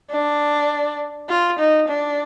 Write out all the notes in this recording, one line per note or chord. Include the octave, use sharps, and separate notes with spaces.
D4
F4
D#4
D4